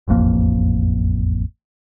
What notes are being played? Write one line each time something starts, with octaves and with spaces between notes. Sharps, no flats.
E1 A1 F2 A#3